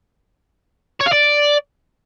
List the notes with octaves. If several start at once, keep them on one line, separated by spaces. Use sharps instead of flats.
C#5
F5
D5